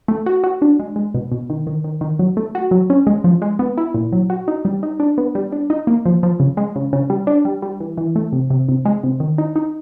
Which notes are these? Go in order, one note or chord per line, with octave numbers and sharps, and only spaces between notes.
A3
F#4
F#4
D4
G#3
G#3
B2
B2
D#3
D#3
D#3
D#3
F#3
A3
F#4
F#3
C#4
G#3
F3
G#3
B3
E4
A#2
F#3
F#4
D#4
G3
D#4
D4
B3
G3
D4
D#4
A#3
F3
F3
C#3
G#3
C#3
C#3
G3
D4
G3
G3
E3
E3
A3
C3
C3
C3
G#3
C3
D#3
D#4
D#4